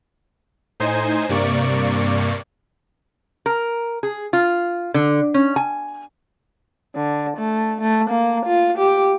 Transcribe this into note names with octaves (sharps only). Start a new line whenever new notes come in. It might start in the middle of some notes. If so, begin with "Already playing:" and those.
A2 D#4 C5 G#5
G2 C3 A#3 D5 C#6
A#4
G#4
F4
D3
C#4
G#5
D3
A3
A3
A#3
F4
G4